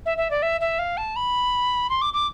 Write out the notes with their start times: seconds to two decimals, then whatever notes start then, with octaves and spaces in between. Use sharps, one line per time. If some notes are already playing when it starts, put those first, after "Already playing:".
0.06 E5
0.17 E5
0.30 D5
0.42 E5
0.61 E5
0.79 F5
0.97 A5
1.16 B5
1.90 C6
2.02 D6
2.14 D6